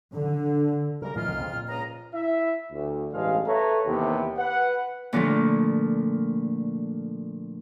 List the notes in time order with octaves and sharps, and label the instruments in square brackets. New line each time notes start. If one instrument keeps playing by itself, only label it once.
[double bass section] D3
[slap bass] C#3 G3 [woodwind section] A#4
[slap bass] A2 E3 F#3 [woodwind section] D#4 F4 F6
[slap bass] C2 F2 D3
F2 C#3 F3
A#2
[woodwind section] C#2 D#5 A#5
[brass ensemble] E4 E5
D2
A1 G2 G#3 A4 F5
A4 B4 C#5 E5 A5 A#5
D#2 C3 E3 B3 G4
B4 F#5
[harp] A#2 D3 F3 A3 A#3